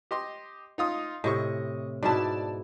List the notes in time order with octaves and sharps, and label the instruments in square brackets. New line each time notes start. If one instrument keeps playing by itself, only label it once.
[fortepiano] G4 D#5 C6
D#4 F4 D#6
[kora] A2 C3 [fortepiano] D#5 C#6
[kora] G#2 B2 E4 [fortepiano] D5 A5